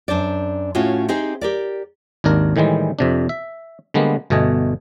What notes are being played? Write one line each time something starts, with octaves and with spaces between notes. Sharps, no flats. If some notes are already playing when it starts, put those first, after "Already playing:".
F#2 D4 C5 D5
A2 C#4 F4 F#4
C4 D#4 G4 G#4 C5
G4 A#4 D5
G#1 D#2 D4 A#4
A2 D#3 E3 G3 G#3
F2 C3 D4
E5
D3 G3 G#3 A#3 B3
G1 B2 A3 D#5 G#5